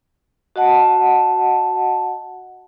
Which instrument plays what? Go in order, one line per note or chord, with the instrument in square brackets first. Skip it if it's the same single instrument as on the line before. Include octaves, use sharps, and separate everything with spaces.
[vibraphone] F#4 D#5 F#5 A5